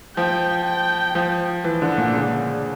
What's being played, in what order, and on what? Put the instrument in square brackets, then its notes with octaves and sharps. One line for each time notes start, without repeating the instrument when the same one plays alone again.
[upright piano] F3 [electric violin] G5
[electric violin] G5
[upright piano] F3
E3
D3
A#2
C#3